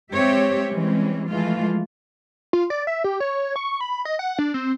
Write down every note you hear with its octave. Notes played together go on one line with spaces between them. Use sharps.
G#3 C4 G4 C#5 E5
E3 G3 G#3 C4 C#4
E3 F3 G#3 A3 F4 F5
F4
D5
E5
G4
C#5
C#6
B5
D#5
F#5
D4
C4